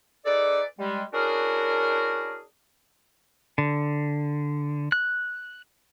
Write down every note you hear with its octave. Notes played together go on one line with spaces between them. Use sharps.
D#4 G#4 A4 B4 D5
G3 G#3
C#4 D4 E4 F#4 G#4 A#4
D3
F#6